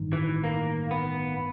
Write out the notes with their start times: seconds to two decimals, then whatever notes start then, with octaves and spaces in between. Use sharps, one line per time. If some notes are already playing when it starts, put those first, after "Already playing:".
Already playing: A1 G2 D#3
0.13 E3
0.44 A#3
0.91 B3